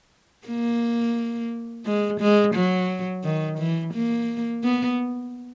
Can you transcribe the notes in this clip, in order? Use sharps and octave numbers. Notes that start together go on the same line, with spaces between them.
A#3
G#3
G#3
F#3
D#3
E3
A#3
B3